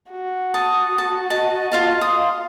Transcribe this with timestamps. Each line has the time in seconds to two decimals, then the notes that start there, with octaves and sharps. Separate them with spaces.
0.10 F#4
0.54 A5 D#6
0.98 A5
1.30 D#5 A5
1.72 F4 D#5 F5 A5
2.01 F5 C6 D#6